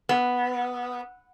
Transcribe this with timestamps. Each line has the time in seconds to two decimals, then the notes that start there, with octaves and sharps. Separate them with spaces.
0.09 B3